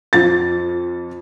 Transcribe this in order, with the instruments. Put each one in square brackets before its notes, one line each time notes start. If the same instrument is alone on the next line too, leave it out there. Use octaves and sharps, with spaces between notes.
[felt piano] F2 A6